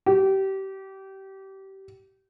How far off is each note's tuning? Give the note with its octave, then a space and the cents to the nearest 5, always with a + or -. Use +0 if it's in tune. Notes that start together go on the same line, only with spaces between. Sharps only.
G4 -25